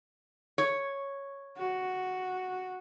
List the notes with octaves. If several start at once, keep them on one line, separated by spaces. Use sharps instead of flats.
C#5
F#4